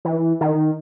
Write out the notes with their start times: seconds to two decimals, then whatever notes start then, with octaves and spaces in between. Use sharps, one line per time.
0.05 E3
0.41 D#3